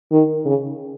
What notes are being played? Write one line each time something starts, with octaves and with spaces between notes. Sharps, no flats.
D#3
C#3